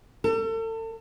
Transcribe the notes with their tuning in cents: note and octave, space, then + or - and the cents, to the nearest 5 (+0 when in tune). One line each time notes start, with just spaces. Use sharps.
A4 +35